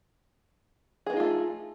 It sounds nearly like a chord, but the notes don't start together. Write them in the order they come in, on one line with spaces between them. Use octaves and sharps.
G#4 B3 D#4 F4 A3